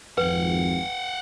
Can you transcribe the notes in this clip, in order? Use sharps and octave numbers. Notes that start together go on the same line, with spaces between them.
G#1 F2 B4 F5 F#5